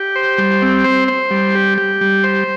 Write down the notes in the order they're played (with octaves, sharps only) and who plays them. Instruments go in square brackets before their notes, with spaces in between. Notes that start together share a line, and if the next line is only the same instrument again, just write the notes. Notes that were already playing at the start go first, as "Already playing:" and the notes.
Already playing: [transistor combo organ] G4
C5
G3
C4
C5
C5
G3
G4
G4
G3
C5